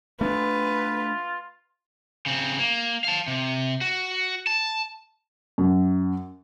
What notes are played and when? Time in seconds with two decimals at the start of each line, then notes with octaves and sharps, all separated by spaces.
0.21 A3 D4 F4 B4
2.26 C#3 C4
2.59 A#3
3.04 F5 A5
3.28 C3
3.81 F#4
4.47 A5
5.58 F#2